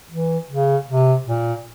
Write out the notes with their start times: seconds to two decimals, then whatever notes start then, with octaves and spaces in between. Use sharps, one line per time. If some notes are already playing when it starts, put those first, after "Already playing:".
0.11 E3
0.50 C#3
0.88 C3
1.27 A#2